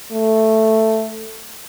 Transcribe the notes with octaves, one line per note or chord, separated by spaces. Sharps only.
A3